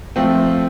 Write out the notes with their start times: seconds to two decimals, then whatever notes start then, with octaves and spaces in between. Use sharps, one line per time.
0.16 F3 A3 C4